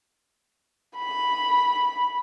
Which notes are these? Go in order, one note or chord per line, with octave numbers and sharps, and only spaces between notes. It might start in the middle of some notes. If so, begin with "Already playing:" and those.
B5